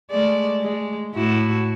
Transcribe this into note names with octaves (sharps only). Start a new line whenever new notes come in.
G#3 A3 D5
G#3
A2 E4 F#4